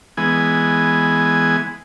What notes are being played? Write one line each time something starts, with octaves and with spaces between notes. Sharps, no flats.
E3 G#3 B3 G#5